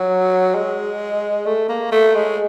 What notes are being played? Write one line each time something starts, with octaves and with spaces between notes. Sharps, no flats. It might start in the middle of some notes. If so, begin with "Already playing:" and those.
Already playing: F#3
G#3
A3
A#3
A3
G#3